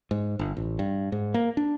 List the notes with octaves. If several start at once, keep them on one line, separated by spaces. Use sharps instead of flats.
G#2
G1
A1
G2
G#2
A#3
D4